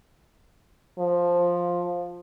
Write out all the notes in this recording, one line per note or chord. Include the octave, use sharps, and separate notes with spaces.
F3